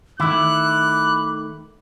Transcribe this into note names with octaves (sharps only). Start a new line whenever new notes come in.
D#3 A3 E4 D6 F#6